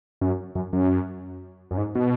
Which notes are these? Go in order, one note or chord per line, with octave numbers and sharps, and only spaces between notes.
F#2
F#2
F#2
F#2
G#2
B2